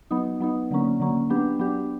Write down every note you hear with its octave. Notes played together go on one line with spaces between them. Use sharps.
F#3 B3 D#4
F#3 B3 D#4
D3 F#3 A#3 C#4
D3 F#3 A#3 C#4
F#3 B3 D4 G4
F#3 B3 D4 G4